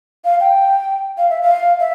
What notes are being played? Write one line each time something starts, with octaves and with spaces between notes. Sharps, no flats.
F5
G5
F5
E5
F5
E5